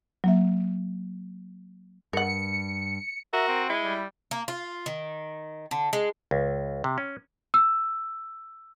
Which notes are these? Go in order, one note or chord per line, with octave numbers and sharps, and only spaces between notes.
F#3 A#3 E5
G2 A#4 F#5 C#7
F#4 A#4 E5
C4
G#3 E4
G3
A#3
F4
D#3
D3
G#3
C#2
C3
C#4
E6